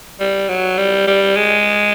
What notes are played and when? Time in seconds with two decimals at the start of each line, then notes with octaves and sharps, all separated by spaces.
0.20 G3
0.49 F#3
0.78 G3
1.07 G3
1.36 G#3